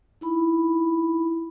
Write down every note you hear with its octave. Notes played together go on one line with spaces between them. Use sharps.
D#4 E4 B5